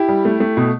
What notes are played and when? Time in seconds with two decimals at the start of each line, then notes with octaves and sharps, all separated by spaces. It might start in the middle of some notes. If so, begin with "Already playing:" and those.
Already playing: E4 G4
0.09 G3
0.25 A3
0.40 A3
0.57 B2